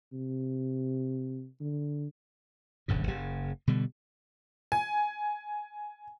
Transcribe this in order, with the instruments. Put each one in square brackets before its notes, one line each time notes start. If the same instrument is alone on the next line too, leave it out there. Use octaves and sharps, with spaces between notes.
[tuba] C3
D3
[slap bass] D#1 G#1 G2 C#3
F#1 C#3
B2 D3 G3
[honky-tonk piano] G#5